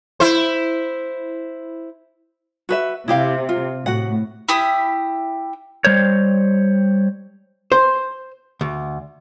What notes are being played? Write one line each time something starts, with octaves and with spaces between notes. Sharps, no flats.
E4 C5
F#4 B4 E5
C3 E4 G4 F5
F4
A2 F#4 F#5
E4 G4 B5 D#6
G3 C5 C#5
C5
D2